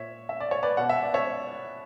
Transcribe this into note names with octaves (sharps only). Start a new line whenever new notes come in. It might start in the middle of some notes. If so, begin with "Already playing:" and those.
Already playing: A#2 C#5 E5
E5
D5
C#5
B4 D5
B2 F#5
E5
D5
C#5 E5